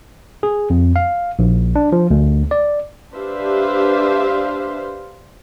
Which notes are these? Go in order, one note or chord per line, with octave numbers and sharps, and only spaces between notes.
G#4
F2
F5
A#1
D4
F3
D2
D5
D4 G4 B4 C5 E5 F5